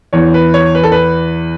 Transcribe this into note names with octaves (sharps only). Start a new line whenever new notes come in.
E2 E3 C#5
B4
C#5
B4
A4
B4